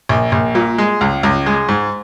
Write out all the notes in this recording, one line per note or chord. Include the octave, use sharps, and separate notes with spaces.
A#1
A#1
A#2
G#3
C#2
C#2
G#3
G#2